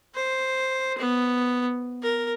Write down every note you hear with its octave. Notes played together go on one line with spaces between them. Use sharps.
C5
B3
A#4